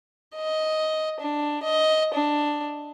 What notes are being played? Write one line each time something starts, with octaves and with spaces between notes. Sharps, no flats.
D#5
D4
D#5
D4